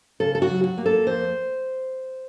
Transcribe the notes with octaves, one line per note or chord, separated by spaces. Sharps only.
C#3 A4
A4
F#4
F#3
F#4
A#3
A4
F2 C5